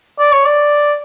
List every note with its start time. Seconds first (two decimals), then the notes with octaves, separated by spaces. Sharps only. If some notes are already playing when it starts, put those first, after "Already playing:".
0.19 D5
0.32 C#5
0.45 D5